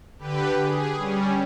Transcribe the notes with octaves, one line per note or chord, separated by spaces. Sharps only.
D3 G4 B4
G#4
G3 C#4